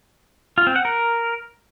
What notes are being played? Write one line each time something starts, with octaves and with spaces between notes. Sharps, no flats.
F4
C4
F#5
A#4